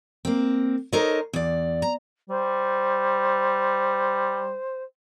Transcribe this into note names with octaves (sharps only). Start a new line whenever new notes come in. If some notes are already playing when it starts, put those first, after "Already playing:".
A#3 C4
D#4 A4 A#4 C5 C#5 D#5
E2 D5
A#5
G3 C5